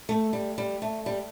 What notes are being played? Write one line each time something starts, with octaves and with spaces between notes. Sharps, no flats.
A3
G3
G3
A3
G3